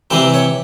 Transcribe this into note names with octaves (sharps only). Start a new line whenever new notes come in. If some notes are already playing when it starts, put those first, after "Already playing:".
C3 E3 G3 C4 C5
C#5